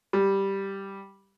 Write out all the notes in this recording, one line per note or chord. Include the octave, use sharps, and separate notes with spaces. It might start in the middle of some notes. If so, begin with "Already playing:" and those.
G3